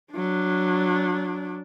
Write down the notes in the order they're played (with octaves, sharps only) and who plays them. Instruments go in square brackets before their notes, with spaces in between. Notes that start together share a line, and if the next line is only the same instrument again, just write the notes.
[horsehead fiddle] F#3 D4